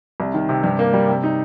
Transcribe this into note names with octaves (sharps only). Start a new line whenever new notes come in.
C2
D#3
C3
G2
A#3
G3
C3
D#4